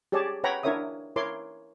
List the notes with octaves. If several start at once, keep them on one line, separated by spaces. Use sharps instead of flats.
G4 G#4 C#5 D5 A5
B4 C#5 F#5 G5 A#5 B5
D4 E4 A#4 C#5 E5 D#6
E4 A#4 C#5 C6 D6